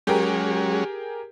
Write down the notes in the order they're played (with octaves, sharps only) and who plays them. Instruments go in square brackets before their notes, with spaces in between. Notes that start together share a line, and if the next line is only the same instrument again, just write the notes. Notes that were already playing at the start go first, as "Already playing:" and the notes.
[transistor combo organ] F#3 G#3 C#4 [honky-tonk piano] G4 G#4 A#4